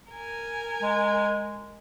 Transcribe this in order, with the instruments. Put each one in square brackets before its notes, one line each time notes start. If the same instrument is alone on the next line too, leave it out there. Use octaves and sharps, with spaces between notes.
[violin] A#4 G#5
[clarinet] G#3